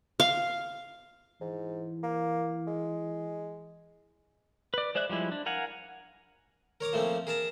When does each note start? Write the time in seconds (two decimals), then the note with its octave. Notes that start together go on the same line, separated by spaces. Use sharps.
0.20 F5
1.41 G#2 E3
2.03 A#3
2.67 G#3
4.74 B4 D5
4.95 G#3 C5 D5 E5 F#6
5.09 F3 G3 G#3 E4
5.32 D4
5.46 A#4 F5 F#5 G#5
6.81 A#4 C#5 A#5 D6
6.93 F3 A3 A#3 C4 C#4
7.27 G#4 A#4 A5 A#5